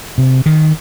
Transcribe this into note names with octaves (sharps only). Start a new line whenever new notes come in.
C3
D#3